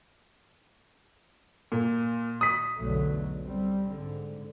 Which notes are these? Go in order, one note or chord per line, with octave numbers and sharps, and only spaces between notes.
A#2
D#6 B6
B1 E2 B2 D3 F#3 A3
G3 C4
G#2 D3